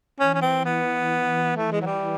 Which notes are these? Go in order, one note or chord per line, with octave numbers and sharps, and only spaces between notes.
E3 C#4
C#4
C4
B3
A3
G#3
F#3
G3